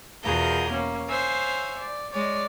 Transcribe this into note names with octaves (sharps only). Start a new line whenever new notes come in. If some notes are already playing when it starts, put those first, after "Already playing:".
E2 B2 F4 G#4 A#4 G6
A#3 C#4
C5 C#5 E5 F5 G#5
D5
G#3 C#5 D5